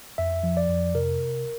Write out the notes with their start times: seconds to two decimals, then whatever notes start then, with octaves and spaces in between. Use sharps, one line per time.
0.18 F2 E5
0.43 F3
0.57 D5
0.69 F2
0.95 C3 A#4